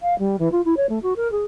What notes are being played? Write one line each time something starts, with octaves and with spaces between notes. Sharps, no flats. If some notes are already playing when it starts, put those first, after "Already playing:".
F5
G3
E3
F4
E4
C#5
A3
F#4
A#4
G#4